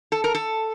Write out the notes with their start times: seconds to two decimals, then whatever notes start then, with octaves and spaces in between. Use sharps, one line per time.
0.12 A4
0.24 A#4
0.35 A4